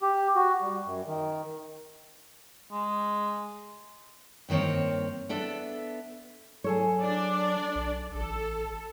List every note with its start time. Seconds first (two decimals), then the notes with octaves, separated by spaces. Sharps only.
0.02 G4
0.36 F#4
0.62 G3
0.85 F#2
1.07 D#3
2.72 G#3
4.49 G2 D#3 A#3 C4 C#5
5.29 B3 D4 A4 E5
6.64 F#3 G#4 A4 C#5
7.02 D4 D5
7.76 B1
8.15 A1 A4